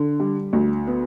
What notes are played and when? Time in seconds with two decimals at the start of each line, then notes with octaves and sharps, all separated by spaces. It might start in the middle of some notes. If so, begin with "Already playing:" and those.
Already playing: D3
0.20 G3
0.53 D2
0.87 B3